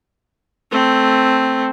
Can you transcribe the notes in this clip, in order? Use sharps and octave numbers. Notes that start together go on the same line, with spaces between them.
A3 C4